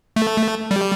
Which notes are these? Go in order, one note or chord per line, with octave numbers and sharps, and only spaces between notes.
A3
G3